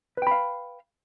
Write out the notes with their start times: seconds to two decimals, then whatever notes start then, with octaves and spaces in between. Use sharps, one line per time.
0.17 B4
0.22 G5
0.27 B5
0.31 F5